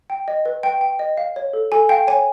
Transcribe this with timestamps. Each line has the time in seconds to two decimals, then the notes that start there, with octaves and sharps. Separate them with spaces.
0.10 G5
0.28 D#5
0.45 B4
0.63 B4 G5
0.81 G5
0.99 D#5
1.17 F5
1.36 C#5
1.53 A4
1.72 A4 G#5
1.89 F5 G5
2.07 C#5 G#5